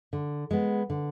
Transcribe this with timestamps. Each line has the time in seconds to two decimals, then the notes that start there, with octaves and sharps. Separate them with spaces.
0.13 D3
0.51 G#3 B3
0.90 D3